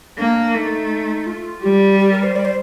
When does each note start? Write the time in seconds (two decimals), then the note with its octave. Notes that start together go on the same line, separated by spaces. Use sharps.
0.18 A#3 D4
0.54 A3 D#4
1.27 F4
1.63 G3 G4
2.00 G4
2.12 A#4
2.23 C5
2.36 D5
2.45 C5